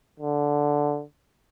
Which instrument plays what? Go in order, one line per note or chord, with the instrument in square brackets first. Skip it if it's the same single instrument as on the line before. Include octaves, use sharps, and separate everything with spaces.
[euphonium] D3